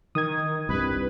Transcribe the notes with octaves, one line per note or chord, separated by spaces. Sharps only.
D#3 D#6 G#6
C2 G2 B4